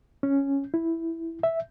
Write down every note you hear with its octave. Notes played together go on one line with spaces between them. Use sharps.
C#4
E4
E5